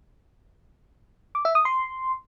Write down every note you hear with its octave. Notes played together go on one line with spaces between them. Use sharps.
D6
E5
D#6
C6